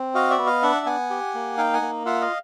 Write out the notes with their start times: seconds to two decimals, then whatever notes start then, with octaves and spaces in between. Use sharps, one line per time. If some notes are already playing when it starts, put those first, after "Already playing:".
Already playing: C4
0.15 F#4 D#5 F5
0.31 D5 E5
0.38 B3
0.47 D#5 F5
0.63 D4 E5 F#5
0.86 B3 F#5 G#5
1.10 G4
1.35 A#3
1.58 D#4 F5 G5
1.74 F#5 G#5
1.82 A#3
2.06 F4 E5 F#5
2.21 D#5 F5